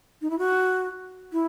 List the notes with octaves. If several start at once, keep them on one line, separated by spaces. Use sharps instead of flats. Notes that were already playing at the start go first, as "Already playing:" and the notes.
D#4
E4
F#4
E4